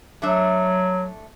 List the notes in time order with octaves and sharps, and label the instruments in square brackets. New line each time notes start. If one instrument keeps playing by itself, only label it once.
[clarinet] F#3 [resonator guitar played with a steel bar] A3 D4 E5